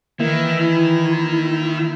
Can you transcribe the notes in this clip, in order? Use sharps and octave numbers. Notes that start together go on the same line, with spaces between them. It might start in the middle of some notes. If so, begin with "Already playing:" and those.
D#3 E3 A#3 E4